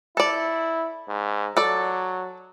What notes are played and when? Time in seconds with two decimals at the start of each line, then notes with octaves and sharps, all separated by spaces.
0.17 E4 A4 D5
1.08 G#2
1.57 F#3 A4 D5